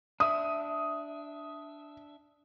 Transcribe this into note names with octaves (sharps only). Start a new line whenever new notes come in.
D4 E5 D#6